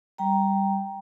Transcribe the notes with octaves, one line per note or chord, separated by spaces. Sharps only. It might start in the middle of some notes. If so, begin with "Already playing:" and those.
G3 G5 A#5